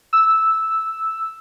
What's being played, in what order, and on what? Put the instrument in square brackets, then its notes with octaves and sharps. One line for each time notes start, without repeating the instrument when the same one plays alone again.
[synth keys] E6